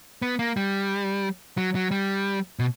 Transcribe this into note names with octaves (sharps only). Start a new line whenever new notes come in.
B3
A#3
G3
F#3
F#3
G3
B2